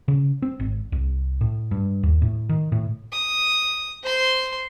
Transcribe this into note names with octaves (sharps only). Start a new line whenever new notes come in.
C#3
C4
G#1
C2
A2
G2
D#2
A2
D#3
A2
D#6
C5 C6